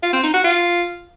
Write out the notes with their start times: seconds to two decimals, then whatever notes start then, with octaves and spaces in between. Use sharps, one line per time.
0.03 F4
0.13 C4
0.23 D#4
0.34 F#4
0.44 F4